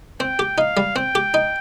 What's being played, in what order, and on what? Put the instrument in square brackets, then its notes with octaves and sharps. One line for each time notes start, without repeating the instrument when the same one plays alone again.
[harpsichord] C4 [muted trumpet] G5
[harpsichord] G4
[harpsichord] D#4 [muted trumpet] F5
[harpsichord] G3
[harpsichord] C4 [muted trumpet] G5
[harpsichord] G4
D#4